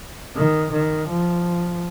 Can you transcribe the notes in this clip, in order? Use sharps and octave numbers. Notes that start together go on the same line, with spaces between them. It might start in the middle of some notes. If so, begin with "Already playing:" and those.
D#3
D#3
F3